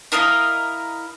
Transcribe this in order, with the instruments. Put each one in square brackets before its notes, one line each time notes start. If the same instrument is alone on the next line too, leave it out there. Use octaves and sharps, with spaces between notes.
[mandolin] E4 A#4 D#5 F5